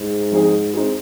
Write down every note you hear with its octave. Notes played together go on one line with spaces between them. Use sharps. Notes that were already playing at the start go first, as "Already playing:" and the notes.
Already playing: G#2
F3 C4 D#4 G#4
G#3 C4 D#4